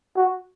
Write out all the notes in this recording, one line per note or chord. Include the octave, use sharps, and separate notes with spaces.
F#4